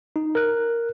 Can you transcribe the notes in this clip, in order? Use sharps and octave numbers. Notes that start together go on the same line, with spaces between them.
D#4
A#4 F#6